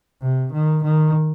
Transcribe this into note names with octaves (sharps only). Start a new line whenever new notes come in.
C3
D#3
D#3